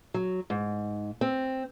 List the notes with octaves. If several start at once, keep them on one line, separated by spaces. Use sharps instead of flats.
F#3
G#2
C4